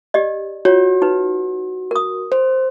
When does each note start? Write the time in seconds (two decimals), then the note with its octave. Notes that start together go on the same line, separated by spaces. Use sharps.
0.14 G4 D5 D#5
0.65 F4 F#4 C#5
1.02 D#4 B4
1.91 A#4 D#6
2.32 C5